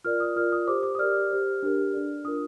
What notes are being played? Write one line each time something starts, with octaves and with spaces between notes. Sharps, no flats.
F4 A#4 D5 F6
D#6
F4 A#4 D5 F6
D#6
G4 C5 D6
D6
D#6
G4 A#4 D5 F6
G4 C5
D4 G4 A#4
D4 A4 D5
D4 F4 A#4 D#6